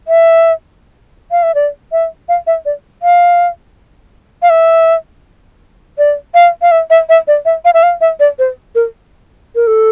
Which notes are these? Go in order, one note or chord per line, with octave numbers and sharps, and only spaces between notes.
E5
F5
E5
D5
E5
F5
E5
D5
F5
F5
E5
D5
F5
F5
E5
E5
E5
D5
E5
F5
E5
F5
E5
D5
C5
A#4
A#4
A4